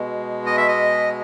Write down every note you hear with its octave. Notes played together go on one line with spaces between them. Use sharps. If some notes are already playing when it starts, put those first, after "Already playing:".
Already playing: B2 G#3
D#5
E5
D#5